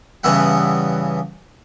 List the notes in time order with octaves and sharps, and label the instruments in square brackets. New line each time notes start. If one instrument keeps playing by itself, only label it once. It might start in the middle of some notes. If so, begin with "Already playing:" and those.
[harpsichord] G2 C#3 E3 B3 E5 F#5